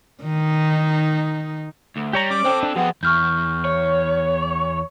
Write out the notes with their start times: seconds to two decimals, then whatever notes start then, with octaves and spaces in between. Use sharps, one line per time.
0.23 D#3 D#4
1.96 D2
2.13 G3 G4 C#5 A#5
2.30 C#4 D5 D6
2.44 C4 A4 C5 G5 E6
2.63 D4
2.76 F2 B3 C4 F#4 G#4
3.03 E2 C#6 F6 G6
3.65 C#5